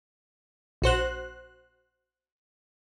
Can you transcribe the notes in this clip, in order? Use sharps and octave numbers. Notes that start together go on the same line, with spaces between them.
A#1 F#4 C5 F#6